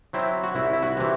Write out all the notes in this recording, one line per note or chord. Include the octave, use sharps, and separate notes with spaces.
F#3 C4 E4
F#4
C2 E4
E4
F#4
C3 E3